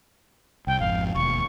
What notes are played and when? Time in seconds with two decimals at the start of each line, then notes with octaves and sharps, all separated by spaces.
0.67 C2 G5
0.80 G#1 F2 F5
1.14 E1 D#2 C#6